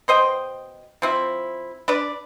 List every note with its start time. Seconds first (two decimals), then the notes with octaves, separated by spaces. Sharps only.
0.08 B2 C5 D#5 G5
1.02 F3 C4 E4
1.88 D4 B4 D5